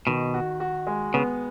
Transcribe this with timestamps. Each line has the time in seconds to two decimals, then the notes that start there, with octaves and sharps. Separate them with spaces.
0.07 B2 D#3
0.34 F#4
0.60 F#4
0.87 G#3
1.14 C#3 B3